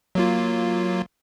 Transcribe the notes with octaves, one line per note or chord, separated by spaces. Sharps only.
F#3 A#3 F4